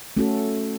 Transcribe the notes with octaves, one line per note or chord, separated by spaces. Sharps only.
A3 C#4 F#4 A4